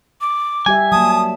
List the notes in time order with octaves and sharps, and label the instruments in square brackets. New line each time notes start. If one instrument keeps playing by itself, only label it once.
[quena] D6
[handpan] G3 G4 E5 [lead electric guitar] G#5
[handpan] F#3 A#3 [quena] A5 [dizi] D#6